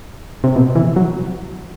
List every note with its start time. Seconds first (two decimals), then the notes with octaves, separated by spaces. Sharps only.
0.44 C3
0.56 B2
0.76 E3
0.96 F#3